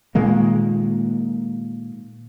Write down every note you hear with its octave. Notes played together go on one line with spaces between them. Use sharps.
A#2 D#3 G#3 A#3